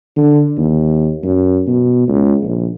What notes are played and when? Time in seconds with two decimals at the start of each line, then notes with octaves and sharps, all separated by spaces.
0.16 D3
0.57 D#2
1.23 F#2
1.67 B2
2.08 C#2
2.43 A#1